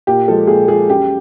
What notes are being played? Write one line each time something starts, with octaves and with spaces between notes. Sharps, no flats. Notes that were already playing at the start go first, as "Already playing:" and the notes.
A#2 G4
F3 G#3 A4
A#2 G#4
F3 G#3 G#4
F#2 G4